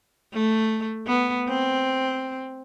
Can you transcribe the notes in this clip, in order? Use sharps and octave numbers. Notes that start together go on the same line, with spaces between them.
A3
B3
C4